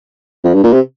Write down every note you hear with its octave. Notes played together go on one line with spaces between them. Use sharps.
F2
G2
A#2
C3